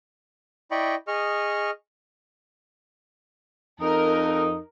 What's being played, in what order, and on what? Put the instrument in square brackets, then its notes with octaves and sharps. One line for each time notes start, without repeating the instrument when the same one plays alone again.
[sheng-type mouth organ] E4 D5 D#5 G5 B5 C#6
G#4 D#5 C#6 F6
[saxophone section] F2 D#4 [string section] A#4